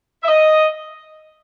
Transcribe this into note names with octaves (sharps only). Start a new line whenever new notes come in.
E5
D#5